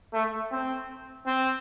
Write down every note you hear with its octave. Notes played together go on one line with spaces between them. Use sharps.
A3
C4
C4